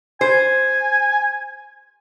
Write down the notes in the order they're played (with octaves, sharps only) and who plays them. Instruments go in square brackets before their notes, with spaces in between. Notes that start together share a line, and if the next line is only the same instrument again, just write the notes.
[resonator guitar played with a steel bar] C5 [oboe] G#5